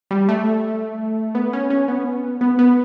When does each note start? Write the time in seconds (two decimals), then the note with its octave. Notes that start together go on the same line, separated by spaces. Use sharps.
0.11 G3
0.29 A3
1.35 B3
1.53 C#4
1.70 C#4
1.88 B3
2.41 B3
2.59 B3